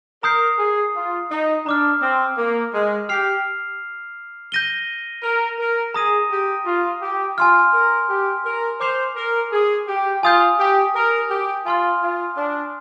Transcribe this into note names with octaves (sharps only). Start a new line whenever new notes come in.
A#4 A#5 D#6 G6 C7
G#4
F4
D#4
D4 A#5 D6 F6
C4
A#3
G#3
G4 F6 C7 F7
G6 A#6 D#7 G7
A#4
A#4
G#4 A#5 D#6 A#6 D#7
G4
F4
G4
F4 G#5 C6 F6
A#4
G4
A#4
C5 A#5 D6 G6 C7 F7
A#4
G#4
G4
F4 G#5 D#6 G6
G4
A#4
G4
F4 G#5 C6 F6
F4
D4